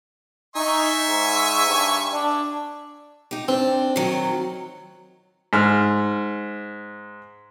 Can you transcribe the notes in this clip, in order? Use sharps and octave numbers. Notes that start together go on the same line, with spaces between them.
D#4 E5 G#5 C#6
G#2
G2
D4
D#4 G4
C4 D4
D#3 F#3
G#2 F6